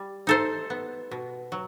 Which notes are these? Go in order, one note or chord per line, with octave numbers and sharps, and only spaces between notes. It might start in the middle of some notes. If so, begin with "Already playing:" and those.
Already playing: G3
D#4 A4 C5
B3
B2
F#3